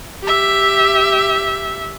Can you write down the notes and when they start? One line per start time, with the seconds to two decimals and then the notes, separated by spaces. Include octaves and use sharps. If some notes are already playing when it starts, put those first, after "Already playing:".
0.23 G4 E5